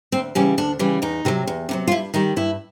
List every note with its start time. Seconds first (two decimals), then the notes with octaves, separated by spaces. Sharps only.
0.12 D2 C4
0.35 C#3 E3 G3 C#4
0.58 D2 D4
0.79 C#3 E3 G3
1.02 E2 D#4
1.25 C3 D#3 F#3
1.47 E2
1.69 C3 D#3 F#3
1.87 F4
1.91 G2 E4
2.14 D#3 G3 D#4
2.36 G2 E4